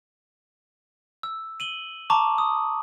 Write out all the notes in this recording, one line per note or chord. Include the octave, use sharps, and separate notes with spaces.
E6
D#7 F#7 G7
A5 A#5 C#6 D6
D#6